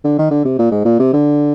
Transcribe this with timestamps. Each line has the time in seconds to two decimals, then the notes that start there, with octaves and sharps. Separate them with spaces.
0.04 D3
0.19 D#3
0.31 D3
0.45 C3
0.59 A#2
0.71 G#2
0.85 A#2
0.99 C3
1.13 D3